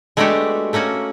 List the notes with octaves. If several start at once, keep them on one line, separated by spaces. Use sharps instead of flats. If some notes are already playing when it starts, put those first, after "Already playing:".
G#3 A3 B3 D4 F#4 G4
A3 A#3 C#4 F#4